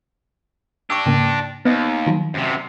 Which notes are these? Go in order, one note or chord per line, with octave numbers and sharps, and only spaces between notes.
D4 G4 C#6 E6
G#2 C#3 A#3
D#2 B3 D#5
D#3 F3 F#3
F#2 C3